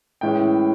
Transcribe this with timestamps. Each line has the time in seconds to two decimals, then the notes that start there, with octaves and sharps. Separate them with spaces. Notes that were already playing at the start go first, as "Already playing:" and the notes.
0.21 A2 E3 G#3 C#4 G5